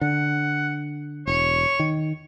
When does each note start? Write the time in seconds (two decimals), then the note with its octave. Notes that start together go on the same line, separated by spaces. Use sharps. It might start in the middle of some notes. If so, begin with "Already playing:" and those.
0.01 D3 F#5
1.27 E1 C#5
1.79 D#3